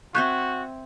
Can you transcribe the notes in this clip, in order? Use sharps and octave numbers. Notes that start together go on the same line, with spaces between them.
C4 F#4 E5 G#5 C#6 F#6 G6